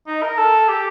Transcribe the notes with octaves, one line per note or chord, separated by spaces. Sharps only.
D#4
A#4
A4
G4